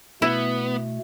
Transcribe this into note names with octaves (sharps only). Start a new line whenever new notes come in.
B2 A3 B3 E4